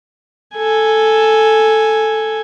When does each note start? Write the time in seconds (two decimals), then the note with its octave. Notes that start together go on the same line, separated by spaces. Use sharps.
0.56 A4 G#5